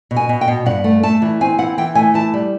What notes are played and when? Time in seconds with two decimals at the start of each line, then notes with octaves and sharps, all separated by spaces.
0.11 B2
0.16 G#5
0.29 B2
0.41 G5
0.48 B2
0.66 G2 F#5
0.84 A3
1.03 A3 A5
1.22 E3
1.41 C4 G#5
1.58 E3 F#5
1.78 E3 G5
1.95 A3 G#5
2.14 E3 A5
2.34 G3